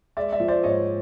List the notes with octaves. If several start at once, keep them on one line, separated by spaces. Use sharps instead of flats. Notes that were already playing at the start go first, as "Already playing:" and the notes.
G#3 D5 E5
D5 E5
F3
C5 D5
G#2 C#5 D#5